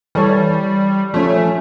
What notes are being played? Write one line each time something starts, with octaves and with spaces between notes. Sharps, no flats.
E3 G3 A4 C#5
F3 A3 C#4